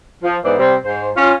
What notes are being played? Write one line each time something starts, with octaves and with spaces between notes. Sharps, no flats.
F3
G#2 E3 B3 C5 D5
C3 G3 C4
G#2 C5
C#4 F4